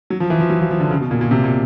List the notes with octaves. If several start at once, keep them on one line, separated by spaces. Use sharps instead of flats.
F#3
F3
E3
F3
F#3
F3
F3
D3
C#3
B2
A#2
A#2
C3
A#2